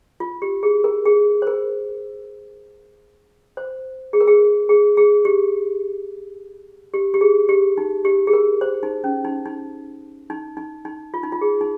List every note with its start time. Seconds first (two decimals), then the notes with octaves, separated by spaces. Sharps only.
0.20 F4
0.42 G4
0.63 G#4
0.84 A#4
1.06 G#4
1.42 C5
1.47 A#4
3.57 C5
4.13 G#4
4.21 A#4
4.28 G#4
4.69 G#4
4.97 G#4
5.25 G4
6.94 G4
7.14 G4
7.21 G#4
7.49 G4
7.78 D#4
8.05 G4
8.27 G#4
8.33 A#4
8.61 C5
8.83 D#4
9.04 C#4
9.25 D#4
9.46 D#4
10.30 D#4
10.57 D#4
10.85 D#4
11.14 F4
11.23 D#4
11.32 F4
11.41 G#4
11.61 D#4